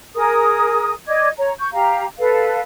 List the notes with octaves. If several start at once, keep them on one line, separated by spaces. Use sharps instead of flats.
G#4 A#4 D#6
D5 D#5 D6 G#6
C#5 A#5
C#6 G6
G4 F5 A#5
A4 B4 F5